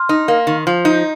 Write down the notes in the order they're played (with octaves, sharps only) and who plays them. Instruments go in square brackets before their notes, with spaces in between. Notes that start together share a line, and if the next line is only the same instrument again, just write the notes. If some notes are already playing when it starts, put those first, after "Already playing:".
Already playing: [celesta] C6 F6
[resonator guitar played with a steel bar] D#4
A#3
D#3
F3
D#4